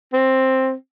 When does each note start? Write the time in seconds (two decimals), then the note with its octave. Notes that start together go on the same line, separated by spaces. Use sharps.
0.13 C4